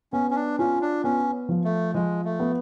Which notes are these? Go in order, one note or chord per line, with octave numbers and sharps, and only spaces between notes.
B3 C#4
C#4
D4
C#4 F4
D4
B3 C#4
F3
A3
F3 G#3
A3
B3